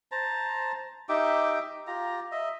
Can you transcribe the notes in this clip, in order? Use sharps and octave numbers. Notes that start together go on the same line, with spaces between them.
C5 A5 A#5
D#4 G4 E5 D6
F4 G4 A#5
D#5 E5